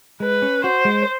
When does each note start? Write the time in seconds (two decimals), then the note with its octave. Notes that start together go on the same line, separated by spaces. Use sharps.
0.20 G#3 B4
0.42 C#4
0.63 F#4 C5
0.85 G#3